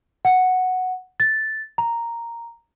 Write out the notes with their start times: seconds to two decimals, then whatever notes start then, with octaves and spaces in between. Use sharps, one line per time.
0.25 F#5
1.20 A6
1.78 A#5